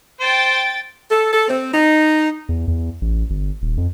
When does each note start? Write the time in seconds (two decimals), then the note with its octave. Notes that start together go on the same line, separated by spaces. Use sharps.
0.21 C5 G5 A6
1.09 A4
1.32 A4
1.47 C4
1.72 D#4
2.49 E2
2.68 E2
3.01 A1
3.30 G1
3.62 D#1
3.77 F2